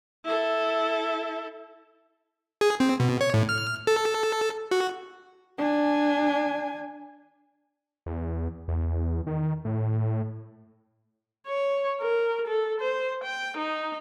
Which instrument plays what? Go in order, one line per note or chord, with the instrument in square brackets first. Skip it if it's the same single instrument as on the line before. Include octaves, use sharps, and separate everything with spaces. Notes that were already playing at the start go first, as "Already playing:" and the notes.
[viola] E4 A4
[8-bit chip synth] G#4
C4
B2
C#5
A2
F6
A4
F#4
[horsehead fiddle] D4 G#5
[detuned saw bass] E2
E2
D#3
A2
[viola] C#5
A#4
A4
C5
G5
D#4